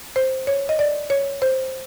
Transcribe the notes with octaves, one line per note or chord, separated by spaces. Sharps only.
C5
C#5
D#5
D5
C#5
C5